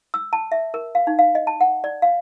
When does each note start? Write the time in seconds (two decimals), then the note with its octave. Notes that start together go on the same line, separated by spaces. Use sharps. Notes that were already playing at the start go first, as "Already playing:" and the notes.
0.14 E6
0.33 A5
0.52 E5
0.74 A#4
0.95 F5
1.07 D#4
1.19 F5
1.35 D#5
1.47 A5
1.61 F#5
1.84 D5
2.02 F5